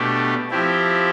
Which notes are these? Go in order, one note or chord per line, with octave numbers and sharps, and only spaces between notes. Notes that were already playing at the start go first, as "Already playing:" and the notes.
Already playing: B2 A3 D4 G4
F3 C4 E4 G4